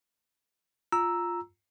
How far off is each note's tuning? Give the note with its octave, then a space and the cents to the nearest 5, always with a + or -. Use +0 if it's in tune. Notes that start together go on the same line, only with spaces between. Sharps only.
F4 +0 A#5 +0 E6 +0